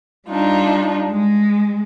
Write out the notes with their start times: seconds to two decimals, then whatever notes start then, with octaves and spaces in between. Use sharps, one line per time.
0.28 G3 D4 D#4 F4
1.07 G#3